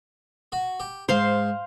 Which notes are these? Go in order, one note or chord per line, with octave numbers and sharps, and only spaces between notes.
F#4
G4
G#2 C5 F5